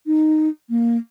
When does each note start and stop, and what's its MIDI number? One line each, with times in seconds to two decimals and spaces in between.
0.06 0.48 63
0.70 0.97 58